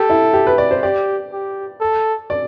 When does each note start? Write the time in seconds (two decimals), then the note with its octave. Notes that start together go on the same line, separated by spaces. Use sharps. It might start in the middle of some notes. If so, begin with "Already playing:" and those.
Already playing: G4 A4
0.10 E4
0.33 G4
0.47 B4
0.58 D5
0.71 C5
0.83 G4 D5
1.32 G4
1.81 A4
2.30 D5